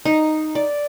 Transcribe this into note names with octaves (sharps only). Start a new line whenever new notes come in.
D#4
D5